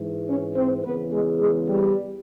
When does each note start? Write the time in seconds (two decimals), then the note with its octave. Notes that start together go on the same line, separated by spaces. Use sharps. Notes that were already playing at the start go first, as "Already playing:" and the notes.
Already playing: G#2 E3
0.28 C#4 C#5
0.56 C4 C5
0.84 E2 C#3 E3 B3 B4
1.12 G#3 G#4
1.40 G#3 G#4
1.69 G3 G4